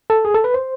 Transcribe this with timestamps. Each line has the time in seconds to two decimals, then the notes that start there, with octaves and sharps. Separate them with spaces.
0.10 A4
0.25 G#4
0.34 A4
0.44 B4
0.54 C5